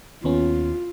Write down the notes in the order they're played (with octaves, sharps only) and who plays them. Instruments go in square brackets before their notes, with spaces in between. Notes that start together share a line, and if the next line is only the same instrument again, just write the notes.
[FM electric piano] D#2 B3 C#4 [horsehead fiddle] F4